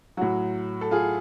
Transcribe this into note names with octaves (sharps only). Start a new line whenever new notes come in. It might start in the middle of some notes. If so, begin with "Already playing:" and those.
A2 F#3 F#4
A4
F4 G#4